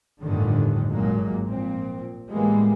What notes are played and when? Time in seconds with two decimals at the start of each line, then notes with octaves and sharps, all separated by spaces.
0.22 G1 F2 A2 D3 D#3
0.92 G#1 A#2 F#3 G#3 A#3
1.47 A#2 F3 C4
2.31 A2 E3 G3 G#3 A#3 B3